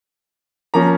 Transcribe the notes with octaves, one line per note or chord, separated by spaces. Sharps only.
F3 A#3 C#4 A#5